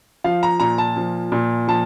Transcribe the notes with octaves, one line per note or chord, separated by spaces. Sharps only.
F3 F5
A#5
A#2 A#5
A5
F3
A#2
F3 A5